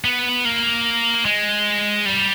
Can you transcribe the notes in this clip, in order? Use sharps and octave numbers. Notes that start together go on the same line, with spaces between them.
B3
A#3
G#3
G3